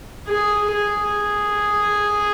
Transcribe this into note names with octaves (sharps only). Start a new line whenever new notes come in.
G#4
G#4